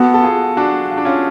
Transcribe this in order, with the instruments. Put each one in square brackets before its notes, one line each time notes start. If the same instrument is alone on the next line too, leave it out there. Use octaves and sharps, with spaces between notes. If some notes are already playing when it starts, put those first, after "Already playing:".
Already playing: [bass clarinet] B3 [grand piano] F#4 A4
[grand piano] A4
F4 G#4
D4 F#4
F4
D4
C#4 F4